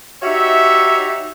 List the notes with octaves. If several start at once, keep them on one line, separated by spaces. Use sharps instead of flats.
D#4 F#4 G4 C#5 E5